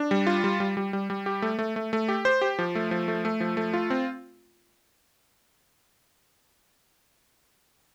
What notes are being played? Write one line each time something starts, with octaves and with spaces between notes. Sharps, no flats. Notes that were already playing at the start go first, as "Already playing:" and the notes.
Already playing: D4
G3
F4
G3
G3
G3
G3
G3
G4
A3
A3
A3
A3
G4
C5
G4
F3
A3
F3
A3
A3
F3
A3
F4
C4